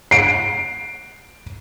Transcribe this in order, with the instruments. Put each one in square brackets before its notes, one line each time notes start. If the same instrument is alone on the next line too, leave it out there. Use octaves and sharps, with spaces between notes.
[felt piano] C7 D7